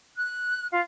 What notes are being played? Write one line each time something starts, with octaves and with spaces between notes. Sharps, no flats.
F#6
F4